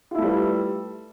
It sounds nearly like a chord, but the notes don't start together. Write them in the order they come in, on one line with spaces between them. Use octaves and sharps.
F4 E4 A3 G3 B4